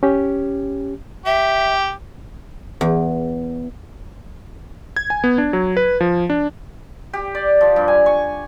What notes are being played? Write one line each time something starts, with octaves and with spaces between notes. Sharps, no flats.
C#4 G4
G4 E5
E2
G#6
G#5
B3
D4
F#3
B4
F3
D4
G4
D5
F3
G2
G#5
C#6